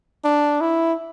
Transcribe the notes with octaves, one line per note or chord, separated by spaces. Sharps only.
D4
E4